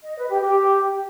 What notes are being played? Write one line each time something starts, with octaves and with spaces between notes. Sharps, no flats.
D#5
B4
G4
G4